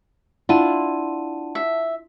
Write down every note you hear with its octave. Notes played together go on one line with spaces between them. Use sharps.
D4 E4 F4 F#5 A5 D#7
E5